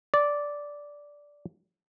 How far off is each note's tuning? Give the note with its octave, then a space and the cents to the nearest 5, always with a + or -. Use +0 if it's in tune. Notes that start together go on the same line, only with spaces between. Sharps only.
D5 -10